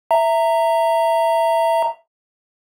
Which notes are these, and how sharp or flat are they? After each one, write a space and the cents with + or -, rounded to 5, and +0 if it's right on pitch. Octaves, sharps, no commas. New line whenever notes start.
E5 +5 A#5 -15